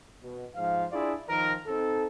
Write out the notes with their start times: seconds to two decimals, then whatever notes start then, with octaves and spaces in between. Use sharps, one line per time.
0.23 B2
0.55 G#2 F3 F5
0.91 D4 E4 F4 G#4 D5
1.29 D#3 F3 A#4
1.67 C4 D#4 A4